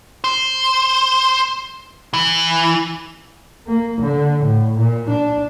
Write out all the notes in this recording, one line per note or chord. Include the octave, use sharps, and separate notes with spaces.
C5
E3
A#3
D3
A2
A#2
D4